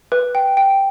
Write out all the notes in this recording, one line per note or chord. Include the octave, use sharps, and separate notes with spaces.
B4
G5
G5